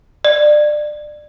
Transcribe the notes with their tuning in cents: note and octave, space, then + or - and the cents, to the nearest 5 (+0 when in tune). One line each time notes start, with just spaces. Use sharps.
D5 +25